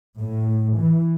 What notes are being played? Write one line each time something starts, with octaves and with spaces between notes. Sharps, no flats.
A2
E3